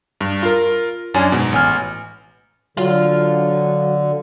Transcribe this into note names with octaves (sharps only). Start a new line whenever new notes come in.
G2
F4 A#4
F#2 C#4 D4 G#5
G#2 B2
A1 G#5 F6
D3 F#3 F4